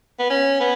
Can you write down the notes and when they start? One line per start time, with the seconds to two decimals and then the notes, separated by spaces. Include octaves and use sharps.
0.19 B3
0.30 C#4
0.60 B3